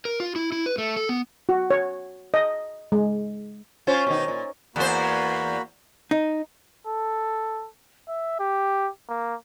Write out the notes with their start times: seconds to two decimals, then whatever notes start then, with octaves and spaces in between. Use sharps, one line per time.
0.05 A#4
0.20 F4
0.36 E4
0.52 E4
0.66 B4
0.78 A3
0.97 A4
1.09 B3
1.49 F#4
1.71 C#5
2.34 D#5
2.92 G#3
3.87 C#4 F4 C5
4.07 B2 D#3 D#4
4.28 A#2
4.76 E2 A#3 F#4 C5 B5
6.11 D#4
6.87 A4
8.09 E5
8.40 G4
9.09 A#3